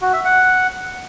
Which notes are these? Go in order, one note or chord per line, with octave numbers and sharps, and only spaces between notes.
F#4
E5
F#5